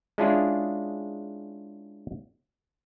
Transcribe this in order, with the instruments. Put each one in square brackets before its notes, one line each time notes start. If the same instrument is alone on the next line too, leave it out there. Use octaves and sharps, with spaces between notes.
[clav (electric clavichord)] G#3 C#4 D4 E4 F4 G#4